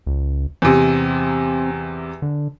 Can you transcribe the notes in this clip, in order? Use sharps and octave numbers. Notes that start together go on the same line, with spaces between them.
C#2
E2 C3 C4
D3